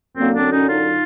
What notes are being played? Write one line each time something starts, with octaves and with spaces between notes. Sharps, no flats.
F#2 D3 F#3 A#3 C4
C4 D4
C#4 D#4
D#4 F4